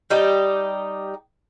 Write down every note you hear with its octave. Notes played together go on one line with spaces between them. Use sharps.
G3 D#4 G4